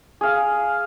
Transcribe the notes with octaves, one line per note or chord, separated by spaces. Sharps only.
G#4 F5